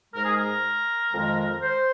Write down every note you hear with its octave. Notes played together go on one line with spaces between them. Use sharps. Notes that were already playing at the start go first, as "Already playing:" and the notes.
G#2 G#3 A#4
G#4
A#4
F2 D#3 G#3
C5